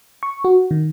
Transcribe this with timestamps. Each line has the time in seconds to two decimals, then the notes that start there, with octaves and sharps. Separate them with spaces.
0.23 C#6
0.45 F#4
0.71 D#3